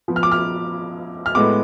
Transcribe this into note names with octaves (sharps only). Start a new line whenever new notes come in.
F3 B3
F6
D6
F6
F6
A2 G#3 B3 D6